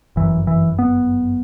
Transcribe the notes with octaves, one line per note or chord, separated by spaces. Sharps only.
G1 F#2 E3
E3
B3